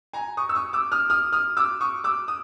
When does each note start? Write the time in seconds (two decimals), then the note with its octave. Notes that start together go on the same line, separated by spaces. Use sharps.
0.13 G#5 A#5
0.37 C#6 D#6
0.49 E6
0.55 C#6 D#6
0.73 D6 E6
0.92 D#6 F6
1.10 D#6 F6
1.32 D#6 F6
1.57 D6 E6
1.81 C#6 D#6
2.04 D6 E6
2.28 D#6